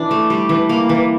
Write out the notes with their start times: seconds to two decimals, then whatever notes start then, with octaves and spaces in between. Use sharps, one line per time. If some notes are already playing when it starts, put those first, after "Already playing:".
Already playing: E3 D4
0.11 A3
0.30 G3
0.49 E3
0.69 A#3
0.89 E3